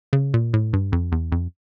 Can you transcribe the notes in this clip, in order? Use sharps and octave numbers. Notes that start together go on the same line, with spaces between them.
C#3
A#2
A2
G2
F2
E2
F2